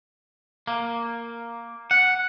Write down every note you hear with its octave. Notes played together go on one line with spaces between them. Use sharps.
A#3
F#5